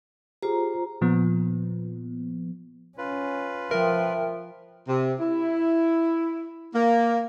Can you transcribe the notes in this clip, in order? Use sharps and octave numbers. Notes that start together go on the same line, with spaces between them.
F4 G4 G#4 C5 A#5
A#2 F3 B3
C#4 F4 B4
F3 A#4 E5 G5
C3
E4
A#3